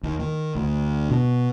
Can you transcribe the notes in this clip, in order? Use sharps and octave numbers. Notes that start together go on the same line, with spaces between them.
D#2
D#3
D2
B2